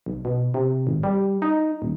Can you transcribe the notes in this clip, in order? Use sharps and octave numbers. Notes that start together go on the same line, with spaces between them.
B1
B2
C3
G#1
G3
D#4
D#1